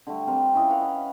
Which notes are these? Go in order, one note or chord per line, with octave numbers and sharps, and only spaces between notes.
D3 G3 A3
G3 C4 A#4
C#4 E4 F4 D#5
B4 F5 F#5
D#5